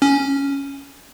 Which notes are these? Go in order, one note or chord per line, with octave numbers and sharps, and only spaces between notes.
C#4